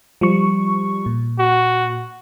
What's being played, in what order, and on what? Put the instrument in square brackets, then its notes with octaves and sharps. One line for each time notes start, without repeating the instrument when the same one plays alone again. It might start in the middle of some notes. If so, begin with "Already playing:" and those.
[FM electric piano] F3 G3 C#6
A#2
[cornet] F#4